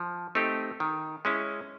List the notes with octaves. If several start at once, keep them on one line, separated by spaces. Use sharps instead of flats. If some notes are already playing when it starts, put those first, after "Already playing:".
Already playing: F3
A3 C4 D#4 G4
D#3
G#3 C#4 E4